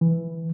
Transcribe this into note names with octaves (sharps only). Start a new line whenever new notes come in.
E3